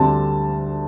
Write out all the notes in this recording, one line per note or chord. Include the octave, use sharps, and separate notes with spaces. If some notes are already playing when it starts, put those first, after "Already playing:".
Already playing: D2 D3 G3 C4 A5